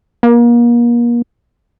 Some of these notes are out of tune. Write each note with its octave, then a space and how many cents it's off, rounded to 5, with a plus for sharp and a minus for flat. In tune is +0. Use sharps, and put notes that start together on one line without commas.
A#3 +35